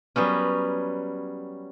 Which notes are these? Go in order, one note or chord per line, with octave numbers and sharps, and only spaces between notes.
F#3 G3 B3 C#4